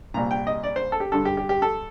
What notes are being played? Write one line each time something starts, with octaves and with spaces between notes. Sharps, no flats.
C2 A#2 A#5
G5
D#5
D5
C5
A4
G4
G2 D3 A4
G4
G4
G4
A4